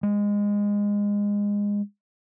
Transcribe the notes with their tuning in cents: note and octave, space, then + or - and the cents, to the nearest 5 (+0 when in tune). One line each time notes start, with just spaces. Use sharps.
G#3 -20